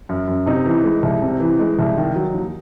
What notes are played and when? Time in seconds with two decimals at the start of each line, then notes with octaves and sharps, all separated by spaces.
0.09 F#2
0.27 F#2
0.46 C3 D#4
0.66 E3
0.84 G#3
1.03 C2
1.22 C3
1.40 E3
1.59 G#3
1.79 C2
1.97 D#3
2.16 F#3
2.34 D#2